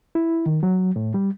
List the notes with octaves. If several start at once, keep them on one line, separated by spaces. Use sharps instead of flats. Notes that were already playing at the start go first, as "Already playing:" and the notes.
E4
D#3
F#3
A2
G3